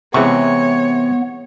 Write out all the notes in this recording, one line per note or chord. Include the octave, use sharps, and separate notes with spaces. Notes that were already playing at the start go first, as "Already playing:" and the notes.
C3 E3 G#3 B3 C#5 C#6